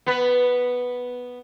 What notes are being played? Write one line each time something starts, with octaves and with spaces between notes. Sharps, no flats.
B3 B4